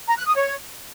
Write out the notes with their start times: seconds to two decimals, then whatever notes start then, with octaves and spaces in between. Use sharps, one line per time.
0.07 A#5
0.16 F#6
0.26 D#6
0.35 C#5